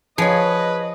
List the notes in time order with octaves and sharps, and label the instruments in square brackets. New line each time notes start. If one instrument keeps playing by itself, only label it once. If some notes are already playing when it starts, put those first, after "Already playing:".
[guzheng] F3 [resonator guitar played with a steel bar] G#4 C#5 [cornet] B4 [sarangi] D#5